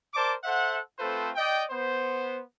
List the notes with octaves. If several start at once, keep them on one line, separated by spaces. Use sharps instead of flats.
A#4 C5 D5 A5 D6
A4 C5 E5 F#5
A3 C4 F4 A4 B4 C5
D5 D#5 G5
B3 C5